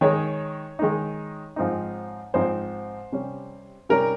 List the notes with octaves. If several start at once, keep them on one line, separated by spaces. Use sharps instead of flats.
D#3 G#3 D#4 C#5
D#3 G#3 D#4
G#2 F3 C4 D#4
G#2 F3 C4 D#4 C5
C3 G3 C#4
C3 G3 C#4 A#4